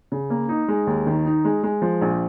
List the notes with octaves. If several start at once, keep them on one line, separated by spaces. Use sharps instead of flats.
C#3
A#3
D#4
G#3
D#2
D#3
D#4
G#3
G#3
F3
A#1